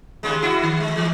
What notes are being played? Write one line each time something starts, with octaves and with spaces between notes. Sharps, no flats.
D#2 C#3 G#3
E4 F#4
D#3
G#3
E3 G#3